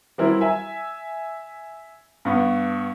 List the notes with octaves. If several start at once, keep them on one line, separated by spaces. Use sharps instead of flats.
E3 F#3 G3 C4 E4 A#4
E5 G#5
G2 B3 C#6